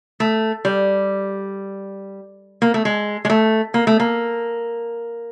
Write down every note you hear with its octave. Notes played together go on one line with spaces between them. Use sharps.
A3
G3
A#3
A3
G#3
G#3
A3
A#3
A3
A#3